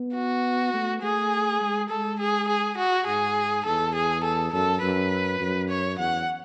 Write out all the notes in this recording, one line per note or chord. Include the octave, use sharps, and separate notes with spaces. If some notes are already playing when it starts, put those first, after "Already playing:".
Already playing: B3
F#4
A3
A3 G#4
G#3
G#3 A4
G#4
G#4
F#4
G#2 G#4
E2 A4
G#4
A4
F#2 A4
F#2 B4
F#2
C#5
E2 F#5